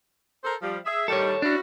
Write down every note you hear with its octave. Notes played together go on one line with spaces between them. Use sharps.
A4 A#4 C5
F3 G3
G#4 E5
D#3 G3 A4 C#5
C#4 D4 E4 F#4